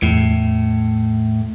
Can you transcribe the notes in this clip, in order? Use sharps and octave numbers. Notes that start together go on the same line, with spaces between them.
E2 A2